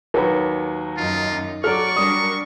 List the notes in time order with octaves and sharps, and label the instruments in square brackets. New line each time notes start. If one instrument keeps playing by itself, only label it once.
[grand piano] D#2 F#3 [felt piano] A#4 B4
[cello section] F#2 D#4 [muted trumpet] F4
[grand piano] F#3 F6 [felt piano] A4 [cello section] D5 [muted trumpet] C#6
[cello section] G3 D4 A#4 [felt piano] D#6